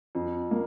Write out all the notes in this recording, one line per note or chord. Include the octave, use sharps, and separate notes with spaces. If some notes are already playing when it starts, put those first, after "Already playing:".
F2
A#3